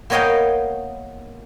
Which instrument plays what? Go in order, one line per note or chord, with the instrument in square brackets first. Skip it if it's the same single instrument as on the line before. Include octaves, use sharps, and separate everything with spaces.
[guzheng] A#3 B3 C#5 D#5 F5 G5